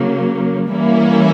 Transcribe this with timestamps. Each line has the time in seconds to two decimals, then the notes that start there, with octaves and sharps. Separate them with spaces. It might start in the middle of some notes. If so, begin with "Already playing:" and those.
Already playing: C#3 F#3 A#3
0.71 E3 G3 A#3 C#4 E4